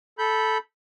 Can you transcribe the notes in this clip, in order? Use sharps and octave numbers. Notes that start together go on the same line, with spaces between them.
A4 B5 G6